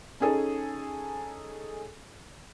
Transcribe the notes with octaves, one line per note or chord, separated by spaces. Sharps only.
C#4 D#4 G#4 A4